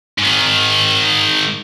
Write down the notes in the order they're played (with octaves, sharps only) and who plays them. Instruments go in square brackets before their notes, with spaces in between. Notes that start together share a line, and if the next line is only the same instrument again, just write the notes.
[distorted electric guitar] G#2 D#3